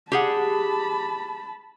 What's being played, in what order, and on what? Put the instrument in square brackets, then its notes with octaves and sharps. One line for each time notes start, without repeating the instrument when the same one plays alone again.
[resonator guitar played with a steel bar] G4 G#4 F#5 [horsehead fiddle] A5 B5